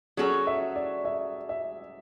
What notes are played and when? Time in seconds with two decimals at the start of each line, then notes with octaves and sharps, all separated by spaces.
0.17 F#3 C#4 F#4 G#4 A4
0.47 E5
0.76 D5
1.05 E5
1.49 E5